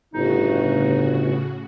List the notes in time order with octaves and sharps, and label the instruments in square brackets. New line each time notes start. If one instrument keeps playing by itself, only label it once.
[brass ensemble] G1 [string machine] A2 C#3 F#4 [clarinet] D#4